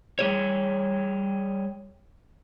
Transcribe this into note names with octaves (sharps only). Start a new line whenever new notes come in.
G3 G#4 C#5